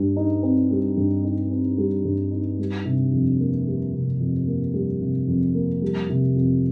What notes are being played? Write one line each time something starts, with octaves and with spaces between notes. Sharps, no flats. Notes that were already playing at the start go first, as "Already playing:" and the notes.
Already playing: G2 G3
D#4
C4
G3
G2
D#4
C4
G3
G2
D#4
G3
C3
F2
A#3
G3
C3
F2
A#3
G3
C3
F2
A#3
G3
C3
F2